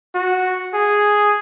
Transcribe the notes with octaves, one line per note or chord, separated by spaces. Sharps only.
F#4
G#4